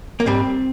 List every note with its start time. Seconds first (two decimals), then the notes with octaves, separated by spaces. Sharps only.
0.20 A#3
0.26 G#2 G3 C4